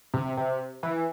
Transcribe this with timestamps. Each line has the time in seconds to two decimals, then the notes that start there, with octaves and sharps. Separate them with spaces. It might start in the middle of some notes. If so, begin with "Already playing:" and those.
0.14 C3
0.37 C3
0.83 E3